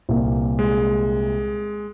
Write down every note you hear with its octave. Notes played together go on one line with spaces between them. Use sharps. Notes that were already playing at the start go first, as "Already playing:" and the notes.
C2 A#2
G#3